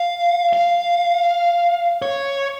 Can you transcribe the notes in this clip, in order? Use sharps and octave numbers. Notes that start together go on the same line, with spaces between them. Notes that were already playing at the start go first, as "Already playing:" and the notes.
Already playing: F5
F5
C#5